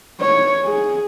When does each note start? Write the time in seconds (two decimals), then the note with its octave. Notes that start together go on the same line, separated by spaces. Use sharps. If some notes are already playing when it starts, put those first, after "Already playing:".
0.21 C#5
0.65 G#4